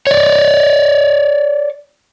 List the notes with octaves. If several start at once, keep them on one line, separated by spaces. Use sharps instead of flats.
C#5 D5